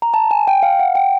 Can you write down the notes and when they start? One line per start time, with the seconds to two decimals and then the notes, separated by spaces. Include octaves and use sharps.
0.02 A#5
0.14 A5
0.31 G#5
0.47 G5
0.63 F5
0.79 F#5
0.95 G5